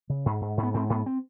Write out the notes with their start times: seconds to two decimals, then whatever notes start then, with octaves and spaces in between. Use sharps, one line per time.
0.10 C#3
0.26 G#2
0.41 G#2
0.57 G#2
0.63 B3
0.74 G#2 C4
0.90 G#2 B3
1.06 C4